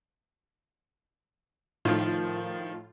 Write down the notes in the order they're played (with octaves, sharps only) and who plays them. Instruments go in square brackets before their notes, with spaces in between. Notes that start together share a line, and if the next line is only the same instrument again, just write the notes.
[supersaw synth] A2 F4 [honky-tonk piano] D#3 F3